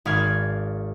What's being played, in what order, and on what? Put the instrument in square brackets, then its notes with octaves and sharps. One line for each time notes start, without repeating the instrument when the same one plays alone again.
[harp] G#1 B4 D5 F5 F6 G#6